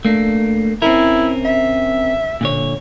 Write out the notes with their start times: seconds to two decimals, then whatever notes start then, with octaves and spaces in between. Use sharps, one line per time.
0.05 A3 A#3 D4
0.82 C4 C#4 E4 A#4
1.45 E5
2.41 A#2 D3 C#5